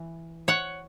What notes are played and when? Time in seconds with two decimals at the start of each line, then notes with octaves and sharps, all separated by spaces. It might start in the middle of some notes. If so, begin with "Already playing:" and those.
Already playing: E3
0.48 C#5 F#5